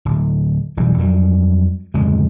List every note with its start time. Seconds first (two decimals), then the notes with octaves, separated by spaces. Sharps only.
0.05 D1
0.77 F1 B1 E3 G3
0.98 F2 F#3 G3
1.94 D1 F2 C#3 G#3